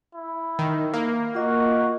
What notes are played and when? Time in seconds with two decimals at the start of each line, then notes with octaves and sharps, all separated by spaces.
0.15 E4
0.59 D#3
0.94 A#3
1.35 F4 F#4 D#5